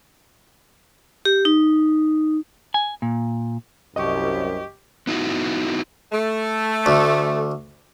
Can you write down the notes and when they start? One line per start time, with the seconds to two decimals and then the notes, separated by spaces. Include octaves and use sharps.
1.25 G4
1.45 D#4
2.74 G#5
3.02 A#2
3.96 C2 F#2 G4 D#5 C#6
5.07 B3 D#4 E4 F#4
6.13 A3
6.86 D2